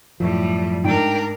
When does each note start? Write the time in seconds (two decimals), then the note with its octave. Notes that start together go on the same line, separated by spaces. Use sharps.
0.20 F#2 A2 F3 G3
0.84 G#2 D4 A#4 G5